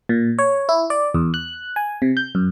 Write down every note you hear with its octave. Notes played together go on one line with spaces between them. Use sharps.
A#2
C#5
E4
D5
E2
F#6
G#5
C3
G6
F#2